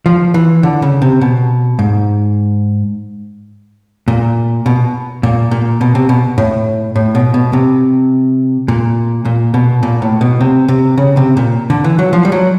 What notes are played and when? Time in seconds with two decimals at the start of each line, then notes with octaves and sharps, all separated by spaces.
0.06 F3
0.34 E3
0.63 D3
0.82 C#3
1.02 C3
1.21 B2
1.79 G#2
4.08 A#2
4.66 B2
5.23 A#2
5.51 A#2
5.81 B2
5.95 C3
6.09 B2
6.38 A2
6.96 A2
7.15 B2
7.34 B2
7.53 C3
8.68 A#2
9.25 A#2
9.54 B2
9.83 A#2
10.02 A2
10.21 B2
10.41 C3
10.68 C3
10.98 C#3
11.17 C3
11.37 A#2
11.70 D3
11.84 E3
11.99 F#3
12.13 F3
12.25 G3
12.32 F#3